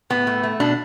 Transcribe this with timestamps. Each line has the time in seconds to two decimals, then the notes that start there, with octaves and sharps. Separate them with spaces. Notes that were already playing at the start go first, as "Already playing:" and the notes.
0.10 A2 B3
0.27 A3
0.43 A3
0.60 B2 D4